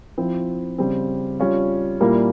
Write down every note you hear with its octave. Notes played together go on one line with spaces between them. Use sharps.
F3 C4 E4
C#3 G3 C4
G3 C#4 F4
A#2 G3 A#3 E4